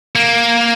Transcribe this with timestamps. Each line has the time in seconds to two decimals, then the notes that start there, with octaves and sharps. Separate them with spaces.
0.15 A#3